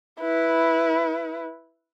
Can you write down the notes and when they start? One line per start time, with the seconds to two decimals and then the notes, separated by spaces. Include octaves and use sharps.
0.20 E4 B4